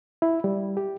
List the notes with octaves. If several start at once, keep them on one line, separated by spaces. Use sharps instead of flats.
E4
G3
G4